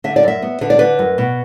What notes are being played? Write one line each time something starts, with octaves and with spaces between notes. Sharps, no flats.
D3 E5
D5
F#2 E5
B3
D3 B4
D5
D3 B4
F#2
B2